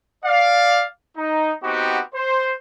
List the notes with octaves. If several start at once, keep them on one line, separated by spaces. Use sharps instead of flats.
D5 F5
D#4
B3 C4 D#4 F#4 G4
C5